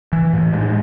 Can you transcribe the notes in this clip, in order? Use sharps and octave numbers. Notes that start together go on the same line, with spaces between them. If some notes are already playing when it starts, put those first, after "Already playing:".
E3
A2
G#3